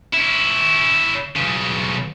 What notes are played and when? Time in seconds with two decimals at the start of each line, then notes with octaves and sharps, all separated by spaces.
0.13 C#4 E4
1.36 B1 C#3